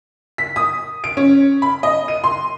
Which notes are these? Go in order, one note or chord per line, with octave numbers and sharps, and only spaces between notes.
B6
D#6
D7
C#4
B5
D#5
D#7
C6